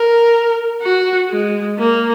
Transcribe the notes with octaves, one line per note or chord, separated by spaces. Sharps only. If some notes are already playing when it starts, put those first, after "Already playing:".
Already playing: A#4
F#4
G#3
A#3